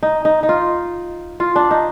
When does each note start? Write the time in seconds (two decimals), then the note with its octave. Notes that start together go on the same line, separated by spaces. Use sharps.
0.03 D#4
0.25 D#4
0.43 D#4
0.49 F4
1.40 F4
1.56 D4
1.71 D#4